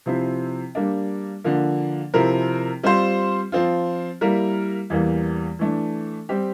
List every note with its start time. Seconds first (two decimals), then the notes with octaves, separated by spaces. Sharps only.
0.06 C3 F3 C4 E4
0.75 G3 A#3 D4
1.44 D3 F3 A#3
2.14 C3 F3 C4 E4 A#4
2.83 G3 C4 F4 C5
3.52 F3 C4 F4
4.21 G3 A#3 E4 A#4
4.90 E2 E3 G3 A#3
5.59 E3 A3 D4
6.29 G3 C4 G4